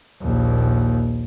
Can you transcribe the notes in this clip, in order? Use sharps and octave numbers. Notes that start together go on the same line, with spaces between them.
A#1 D#2